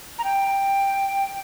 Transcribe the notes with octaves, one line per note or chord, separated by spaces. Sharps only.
A#5
G5